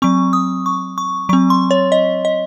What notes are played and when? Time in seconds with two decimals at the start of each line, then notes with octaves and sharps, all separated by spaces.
0.02 F#3 C4 C#6
0.33 D#6
0.66 C#6
0.98 C#6
1.29 F#3 C4 C#6
1.50 C6
1.71 C#5
1.92 D#5
2.25 D#5